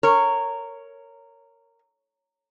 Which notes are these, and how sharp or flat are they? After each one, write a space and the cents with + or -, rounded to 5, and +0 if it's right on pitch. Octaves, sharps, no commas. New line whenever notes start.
A#4 -15 C#5 +0